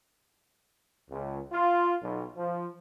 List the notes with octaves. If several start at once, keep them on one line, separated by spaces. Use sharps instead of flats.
C#2
F4
B1
F3